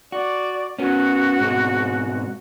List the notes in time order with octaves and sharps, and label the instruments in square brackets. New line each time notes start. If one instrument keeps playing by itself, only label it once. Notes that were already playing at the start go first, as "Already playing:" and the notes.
[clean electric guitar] F#4 [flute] D5
[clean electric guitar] B3 C#4 [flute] F#4
[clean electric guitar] G#2 B2 C4